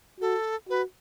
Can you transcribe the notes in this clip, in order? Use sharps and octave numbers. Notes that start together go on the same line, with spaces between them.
F#4 A4
F#4 B4